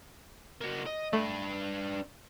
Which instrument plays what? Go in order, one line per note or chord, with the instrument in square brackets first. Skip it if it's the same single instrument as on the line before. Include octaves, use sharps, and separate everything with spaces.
[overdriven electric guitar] A#3 F#4
D#5
[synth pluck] A3 [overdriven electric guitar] D4 B4